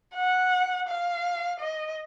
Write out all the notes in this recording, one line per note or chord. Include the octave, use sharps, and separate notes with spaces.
F#5
F5
D#5